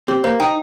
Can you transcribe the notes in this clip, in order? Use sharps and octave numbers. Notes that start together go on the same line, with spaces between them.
C4 G4
A#3 C5
D#4 G5